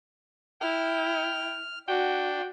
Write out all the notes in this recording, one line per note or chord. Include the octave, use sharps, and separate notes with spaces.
E4 G5 F6
D4 F#4 G5